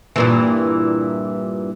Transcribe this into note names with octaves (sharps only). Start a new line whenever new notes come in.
G2 A#2 E3